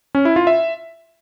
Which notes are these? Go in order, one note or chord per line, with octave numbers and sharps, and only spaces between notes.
C#4
E4
F4
E5